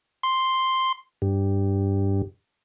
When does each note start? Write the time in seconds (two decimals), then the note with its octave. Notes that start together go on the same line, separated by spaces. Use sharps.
0.23 C6
1.22 G2